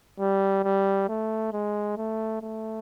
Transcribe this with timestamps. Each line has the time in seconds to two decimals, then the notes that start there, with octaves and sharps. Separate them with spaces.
0.20 G3
0.64 G3
1.09 A3
1.53 G#3
1.97 A3
2.42 A3